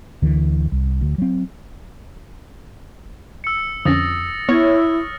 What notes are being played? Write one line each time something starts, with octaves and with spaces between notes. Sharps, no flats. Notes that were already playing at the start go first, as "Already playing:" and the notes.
D2 D3 E3
C2
D2
F#3 C4
E6 C#7
F2 D3 C#4 D#6 A6 A#6
B3 E4 C#5 F6